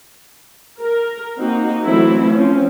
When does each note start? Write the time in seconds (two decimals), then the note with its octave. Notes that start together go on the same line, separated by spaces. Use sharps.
0.78 A#4
1.38 A#3 C4 D#4 F#4
1.84 E3 F#3 A3 B3 C4 E4
2.30 F3 C4 C#4